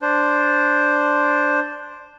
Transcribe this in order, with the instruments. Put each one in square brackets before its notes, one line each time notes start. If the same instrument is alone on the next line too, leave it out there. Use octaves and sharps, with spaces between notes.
[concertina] D4 C5